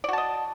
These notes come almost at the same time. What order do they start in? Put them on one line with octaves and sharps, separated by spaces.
D5 F#4 A5 D#5